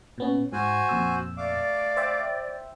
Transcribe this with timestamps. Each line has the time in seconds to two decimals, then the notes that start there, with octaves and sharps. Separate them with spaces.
0.18 A#2 B3 C#4
0.53 G#2 F#4 C5 G#5
0.89 F2 A#2 E6
1.37 A3 D5 F5 D6
1.97 C5 E5 G5